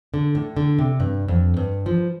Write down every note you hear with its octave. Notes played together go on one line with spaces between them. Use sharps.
D3
A2
D3
C3
G2
F2
G2
F3